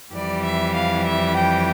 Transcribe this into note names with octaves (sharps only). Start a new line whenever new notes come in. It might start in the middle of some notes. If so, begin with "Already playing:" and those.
F2 E3 G3 D5
E5
F5
E5
G5